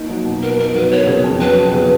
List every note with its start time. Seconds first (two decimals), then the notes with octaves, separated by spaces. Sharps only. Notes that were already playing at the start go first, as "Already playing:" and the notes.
Already playing: A#3 D#4
0.09 F#3
0.25 B2
0.43 B3 A#4
0.58 D#4 A#4
0.74 F#3 B4
0.91 B3 C#5
1.07 C#3
1.24 F2
1.40 F#3 B4
1.57 B3
1.73 C#3